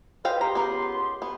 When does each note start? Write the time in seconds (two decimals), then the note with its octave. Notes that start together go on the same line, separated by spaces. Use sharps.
0.25 B4 C5 D#5 F5 G5
0.41 C#2 G4 A#5 C6
0.55 B3 A#4
1.22 B3